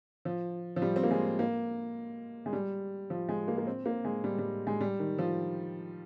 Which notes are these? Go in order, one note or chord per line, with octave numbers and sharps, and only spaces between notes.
F3
F3
G3
C4
A#3
G#3
A#3
G#3
G3
F3
G#3
A#3
A#3
C4
A#3
G#3
G3
G3
G#3
G3
D#3
F3